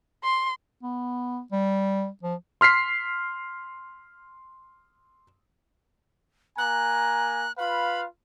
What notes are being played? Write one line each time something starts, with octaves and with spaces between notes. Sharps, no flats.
C6
B3
G3
F3
C6 F6 B6 C7
A#3 G#5 A#5 F#6
F4 B4 F5 B5